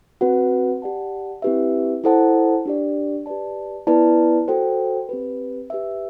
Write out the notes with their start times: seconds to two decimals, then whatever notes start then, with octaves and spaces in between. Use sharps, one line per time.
0.21 C4 F#4 B4 F#5
0.82 G4 D5 F#5 A5
1.42 C4 E4 G4 B4 E5
2.04 E4 A4 C5 F#5 A5
2.66 D4 G4 D5
3.26 G4 B4 D5 A5
3.87 B3 E4 B4 D5 A5
4.48 F#4 A4 C5 G5
5.09 C4 G4 B4
5.70 G4 B4 E5